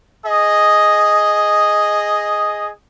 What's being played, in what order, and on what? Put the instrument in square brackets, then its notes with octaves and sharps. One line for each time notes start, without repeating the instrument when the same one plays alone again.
[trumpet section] G#4 D#5